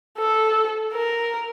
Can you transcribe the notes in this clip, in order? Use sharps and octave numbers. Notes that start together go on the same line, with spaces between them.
A4
A#4